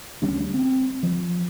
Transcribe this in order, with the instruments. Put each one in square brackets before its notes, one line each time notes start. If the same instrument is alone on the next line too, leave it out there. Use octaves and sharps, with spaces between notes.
[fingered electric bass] D2 D3 G3 C#4
C4
F3